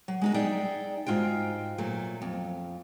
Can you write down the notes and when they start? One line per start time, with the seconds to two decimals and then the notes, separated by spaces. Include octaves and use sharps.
0.08 F#3
0.22 G#3 D#4 F#4
0.34 D#4 G#4 D5 E5 G5
1.07 G#2 F4 F#4 G5
1.78 A#2 F#3 A3
2.22 F2